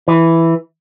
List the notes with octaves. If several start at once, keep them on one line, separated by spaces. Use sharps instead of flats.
E3